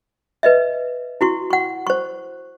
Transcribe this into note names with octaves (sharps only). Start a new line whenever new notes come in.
B4 D#5 E5
E4 F#4 C#6
F#5 C#6
C5 C#6